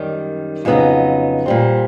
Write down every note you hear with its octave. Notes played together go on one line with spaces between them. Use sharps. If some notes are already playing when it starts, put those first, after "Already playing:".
Already playing: F#2 D#3 G3
F2 C#3 F#3 B3 D#4
A#2 G3 C4